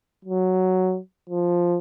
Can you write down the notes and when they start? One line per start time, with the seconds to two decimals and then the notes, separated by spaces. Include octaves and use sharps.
0.25 F#3
1.29 F3